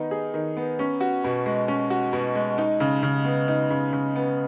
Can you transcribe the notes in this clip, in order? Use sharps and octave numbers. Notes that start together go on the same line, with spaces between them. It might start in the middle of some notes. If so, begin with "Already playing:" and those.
Already playing: D#3 B3 D#4
G#4
D#3
B3
C#4
F#4
B2
G#3
C#4
F#4
B2
G#3
D#4
C#3
C#3
B3
D#4
C#3
C#3
B3